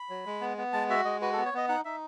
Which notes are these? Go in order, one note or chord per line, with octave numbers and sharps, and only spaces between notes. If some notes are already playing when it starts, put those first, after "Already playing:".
Already playing: B5
F#3
G#3
B3
B3
G#3 A5
F#4 E5
G#3 D#5
F#4 B4
A4
B3
C#5
B3 D#5
D#4 F#5
D#4 E5